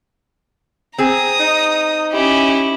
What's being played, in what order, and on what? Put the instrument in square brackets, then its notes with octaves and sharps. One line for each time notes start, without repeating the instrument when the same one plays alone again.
[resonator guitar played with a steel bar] C4 G#4 [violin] A#5 D#6
[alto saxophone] D#4
[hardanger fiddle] C#4 E4 [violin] G4